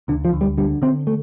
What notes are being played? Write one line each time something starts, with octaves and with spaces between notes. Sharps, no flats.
D2 D3
F3
D2
G3
D3 G3
D3 C4
A3